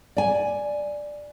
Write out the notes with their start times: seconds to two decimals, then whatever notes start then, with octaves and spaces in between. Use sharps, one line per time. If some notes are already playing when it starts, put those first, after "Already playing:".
0.17 D5 G#5